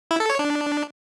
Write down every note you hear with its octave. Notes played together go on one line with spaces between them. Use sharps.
E4
A4
C#5
D4